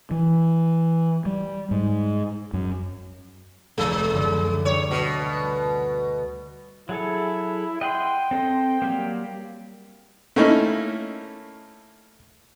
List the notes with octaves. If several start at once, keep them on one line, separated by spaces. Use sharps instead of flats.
E3
G3
G#2
F#2
F1 D2 G#3
F#2 D3
G3 D4 C#5
B2
F#6
F#3 E4 G#4 A4
D#5 F#5 G5 C6
C4 A4 D#5
F#3 G3 A#3
A3 A#3 C#4 D#4 E4